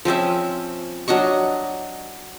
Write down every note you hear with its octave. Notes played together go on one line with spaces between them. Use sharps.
F3 C4 C#4 E5
F#3 D4 D#5 C#6